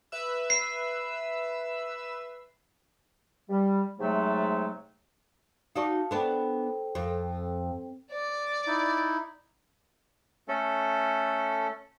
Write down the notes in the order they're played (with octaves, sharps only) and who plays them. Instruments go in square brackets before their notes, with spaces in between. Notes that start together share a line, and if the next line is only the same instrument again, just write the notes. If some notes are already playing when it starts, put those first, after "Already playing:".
[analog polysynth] B4 E5 E6
[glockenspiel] C7
[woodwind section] G3
G#2 C3 F#3 G#3 A3
[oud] D#4 F#4 D5 [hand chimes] F5 A5 C#6
[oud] B3 D4 [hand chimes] A4 C5 G5
[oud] F2
[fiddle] D5
[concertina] D#4 E4
[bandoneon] A3 C#4 A4